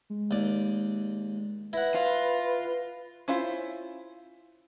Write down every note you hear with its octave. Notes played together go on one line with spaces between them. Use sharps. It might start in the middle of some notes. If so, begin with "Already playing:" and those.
G#3
D#2 D5
E4 B4 F#5 A#6
F4
C#4 E4 F4 C5